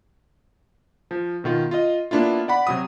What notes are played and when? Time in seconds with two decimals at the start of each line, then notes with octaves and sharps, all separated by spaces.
1.11 F3
1.44 B2 D#3 F4
1.71 F4 D#5
2.11 A#3 B3 D4 E4 F4
2.48 D5 F#5 B5
2.67 C3 F#3 D#6